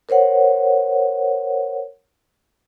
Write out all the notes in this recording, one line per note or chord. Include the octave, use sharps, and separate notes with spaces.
A#4 C5 C#5 F#5